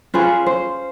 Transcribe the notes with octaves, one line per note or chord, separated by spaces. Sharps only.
C#4 F4 G#4 B4 C5
C5